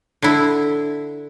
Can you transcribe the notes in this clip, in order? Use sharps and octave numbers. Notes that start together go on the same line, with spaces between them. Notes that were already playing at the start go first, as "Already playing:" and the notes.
D3 E4